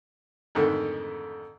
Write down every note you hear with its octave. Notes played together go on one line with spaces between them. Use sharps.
F2 G#2 D3 D#3 A3